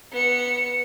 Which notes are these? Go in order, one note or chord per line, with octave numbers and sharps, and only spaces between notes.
B3 C#7